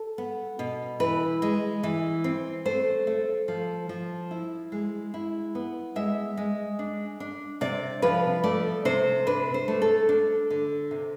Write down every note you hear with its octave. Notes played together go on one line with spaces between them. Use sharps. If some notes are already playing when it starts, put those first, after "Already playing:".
Already playing: A4
B3
B2
E3 B4
G#3
E3
C4
A3 C5
A3
F3
F3
E4
G#3
E4
B3
G#3 E5
G#3
D4
D4
C3 D5
F3 B4
A3 D5
C3 C5
D4 B4
C5
A3
A4
D4
D3
C3